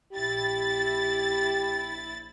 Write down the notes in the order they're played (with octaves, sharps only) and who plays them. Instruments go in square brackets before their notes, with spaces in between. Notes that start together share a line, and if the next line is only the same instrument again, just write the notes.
[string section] A#1 E4 A6 [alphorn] G4